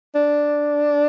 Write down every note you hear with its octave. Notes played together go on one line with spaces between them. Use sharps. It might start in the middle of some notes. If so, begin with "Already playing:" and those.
D4